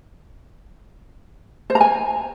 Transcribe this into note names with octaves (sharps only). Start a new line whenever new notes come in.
C5
A#5
G#5